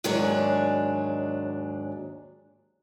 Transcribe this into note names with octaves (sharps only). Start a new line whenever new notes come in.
D#2 G#2 F#3 D4 G#4 C#5